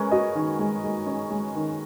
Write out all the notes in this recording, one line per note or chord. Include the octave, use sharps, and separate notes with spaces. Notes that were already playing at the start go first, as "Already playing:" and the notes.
Already playing: G#3 C#4 A#4 B4
F#4 D#5
D#3
G#3
G#3
C#4
G#3
D#3